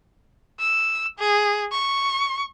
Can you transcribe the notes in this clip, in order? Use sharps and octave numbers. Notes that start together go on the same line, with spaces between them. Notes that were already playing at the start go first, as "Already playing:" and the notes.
E6
G#4
C#6